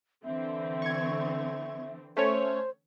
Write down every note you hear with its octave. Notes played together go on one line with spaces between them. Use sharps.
D3 E3 C4 E5
C#6 G#6
A3 C#4 C5 C#5